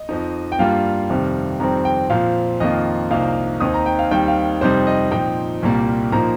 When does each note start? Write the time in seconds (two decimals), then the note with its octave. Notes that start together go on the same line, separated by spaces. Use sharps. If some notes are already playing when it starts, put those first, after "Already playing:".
Already playing: D#5
0.09 F2 F3 D#4
0.52 G5
0.59 G2 G3 A#3 F4 F5
1.09 F2 C3 D#3 G3
1.60 F2 D#3 G3 C4 A#5
1.85 G5
2.10 A#2 F3 C4 F5
2.60 F2 D#3 A#3 F4 D#5
3.11 C2 C3 F3 A#3 D#4 F5
3.60 D#2 D#3 C4 D#4 D#6
3.74 A#5
3.86 G5
3.99 F5
4.11 D#2 D#3 G3 C4 G5
4.28 F5
4.61 F2 C3 G3 D#4 C5
4.87 D#5
5.12 A#2 F3 C4 D#4 G5
5.62 C2 A#2 G3 A#3
6.12 A#2 F3 A#3 D#4 A#5